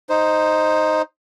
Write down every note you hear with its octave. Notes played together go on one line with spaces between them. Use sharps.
D#4 C5